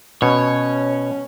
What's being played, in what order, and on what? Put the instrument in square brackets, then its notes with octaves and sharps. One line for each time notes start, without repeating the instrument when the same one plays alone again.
[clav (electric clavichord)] B2 [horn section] C#4 [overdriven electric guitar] C#5